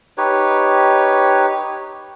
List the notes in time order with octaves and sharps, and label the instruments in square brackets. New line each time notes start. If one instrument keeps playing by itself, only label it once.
[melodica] D#4 G4 B4 C#5